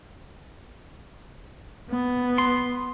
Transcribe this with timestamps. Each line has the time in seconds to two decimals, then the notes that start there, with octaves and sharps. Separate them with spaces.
1.90 B3
2.38 C6